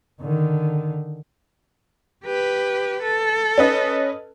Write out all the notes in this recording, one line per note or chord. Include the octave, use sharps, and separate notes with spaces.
D3 D#3
G4 B4
A4
C#4 B4 D#5